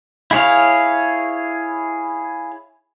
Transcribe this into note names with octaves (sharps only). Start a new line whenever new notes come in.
E4 G#4 C#5 F5